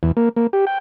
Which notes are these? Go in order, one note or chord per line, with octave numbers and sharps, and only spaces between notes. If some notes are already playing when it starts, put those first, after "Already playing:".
E2
A#3
A#3
G4
G5